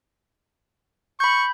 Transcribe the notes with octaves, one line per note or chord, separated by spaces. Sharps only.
B5 C#6 G6